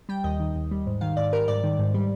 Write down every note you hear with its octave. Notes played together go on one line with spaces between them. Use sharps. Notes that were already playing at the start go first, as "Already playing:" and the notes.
G3 G5
D#2 D#5
D#3
D#2
G3
G#2
D#3 F5
G#2 D5
G3 A#4
G#2 D5
D#3
G#2
G3